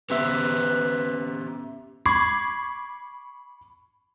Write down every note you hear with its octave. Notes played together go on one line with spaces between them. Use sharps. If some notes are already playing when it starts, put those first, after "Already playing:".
B3 C#4 G4 B4 C5 E5
B5 C#6 D6 G#6 C7